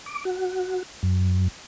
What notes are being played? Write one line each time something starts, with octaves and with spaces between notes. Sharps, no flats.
D6
F#4
F#2